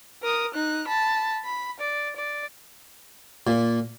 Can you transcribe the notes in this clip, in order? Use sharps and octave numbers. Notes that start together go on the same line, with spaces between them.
A#4 D#6
D#4 F#6
A5 B5
B5
D5
D5
A#2